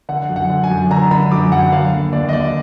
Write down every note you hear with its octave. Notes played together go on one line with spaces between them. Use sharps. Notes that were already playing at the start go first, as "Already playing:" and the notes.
D3 F#5
F#2
F#5
D3
G#5
F#2
D3 A#5
D3 B5
F#2 D6
F#2 F#5
D3 F5
D#2
D#2 D5
D#5
D#2 D5